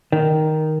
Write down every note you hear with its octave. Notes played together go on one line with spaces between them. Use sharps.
D#3